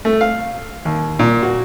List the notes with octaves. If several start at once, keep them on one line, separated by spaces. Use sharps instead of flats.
A3
F5
D#2
A#2
F#4